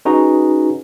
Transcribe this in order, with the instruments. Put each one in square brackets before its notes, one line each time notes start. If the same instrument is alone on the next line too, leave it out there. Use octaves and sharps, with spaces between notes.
[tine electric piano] C#4 D#4 F#4 G#4 B4 A#5